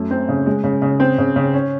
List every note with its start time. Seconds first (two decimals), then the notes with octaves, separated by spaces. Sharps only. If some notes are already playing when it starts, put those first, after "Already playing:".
Already playing: F#2 A3
0.11 C4
0.29 C#3
0.46 G#3
0.64 C#3
0.82 C#3
1.00 C4
1.18 C#3
1.36 C#3
1.54 C#4